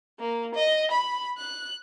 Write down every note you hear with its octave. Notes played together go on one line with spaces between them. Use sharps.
A#3
D#5
B5
F#6